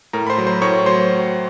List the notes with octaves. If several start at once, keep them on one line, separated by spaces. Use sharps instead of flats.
A2 A#4 A#5
B5
C5 C6
F#3
C5 C6
A2 C#5 C#6
F#3 C5 C6